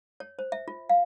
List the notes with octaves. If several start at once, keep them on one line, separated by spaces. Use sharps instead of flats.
C#5
C5
E5
F4
F5